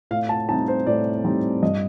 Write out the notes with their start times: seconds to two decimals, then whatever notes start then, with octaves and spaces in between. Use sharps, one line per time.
0.11 A2 F5
0.29 A5
0.48 G3 C4 D#4 A5
0.68 C5
0.87 A2 D5
1.24 G3 C4 D#4
1.63 G2 D#5